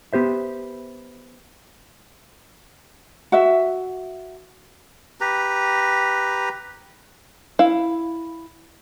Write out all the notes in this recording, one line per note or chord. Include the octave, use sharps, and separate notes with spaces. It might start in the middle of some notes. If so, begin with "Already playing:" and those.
B3 G4 C5 E5
F#4 E5
G4 B4 A#5
E4 F5